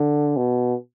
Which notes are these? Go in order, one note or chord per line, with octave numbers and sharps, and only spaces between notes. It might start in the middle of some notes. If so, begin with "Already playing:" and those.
Already playing: D3
B2